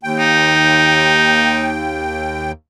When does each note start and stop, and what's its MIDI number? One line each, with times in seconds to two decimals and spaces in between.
0.03 2.52 39
0.03 2.52 79
0.19 1.74 63